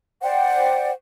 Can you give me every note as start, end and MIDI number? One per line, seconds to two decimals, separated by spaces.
0.23 0.92 72
0.23 0.92 74
0.23 0.92 78
0.23 0.92 79